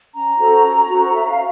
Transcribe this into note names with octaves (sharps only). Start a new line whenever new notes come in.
C#4 A#5
F#4 A4 C5
C#4
F#4 A4 C5
C#4 E5
F5